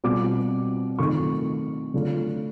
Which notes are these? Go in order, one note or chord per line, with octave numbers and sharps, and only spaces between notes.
B2 G3 C4 F4 D6
D#3 F#3 A3 C4 F4 C#6
D3 F#3 A3 D4 F4